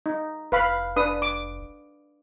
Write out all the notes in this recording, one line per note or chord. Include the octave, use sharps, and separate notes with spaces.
D#4
F1 B4 F5 B5
D4 B4 D#6
D6